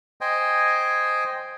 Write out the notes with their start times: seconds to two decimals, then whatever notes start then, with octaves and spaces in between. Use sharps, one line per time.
0.21 C5 D#5 G5 G#5